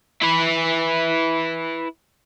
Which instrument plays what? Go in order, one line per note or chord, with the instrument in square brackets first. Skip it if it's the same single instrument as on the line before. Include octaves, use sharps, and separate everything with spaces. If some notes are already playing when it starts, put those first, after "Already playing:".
[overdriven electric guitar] E4 B4